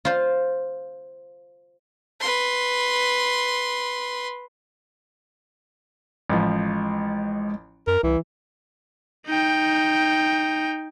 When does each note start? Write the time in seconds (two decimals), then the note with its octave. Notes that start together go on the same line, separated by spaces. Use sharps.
0.05 F4 C5
2.20 B4 C6
6.30 A1 F3 G#3
7.87 F#2 A#4
8.03 C2 E3
9.27 D#4 G5